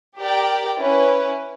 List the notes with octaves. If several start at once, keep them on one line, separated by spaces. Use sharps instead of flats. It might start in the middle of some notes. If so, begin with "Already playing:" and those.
G4 A#4 D5 G5
C#4 E4 B4